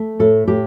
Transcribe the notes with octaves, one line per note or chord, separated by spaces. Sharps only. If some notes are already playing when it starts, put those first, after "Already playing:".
Already playing: A3
A2 A4
A2 G4